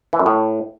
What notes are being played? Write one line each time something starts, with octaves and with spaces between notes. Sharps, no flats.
E3
F#2
A2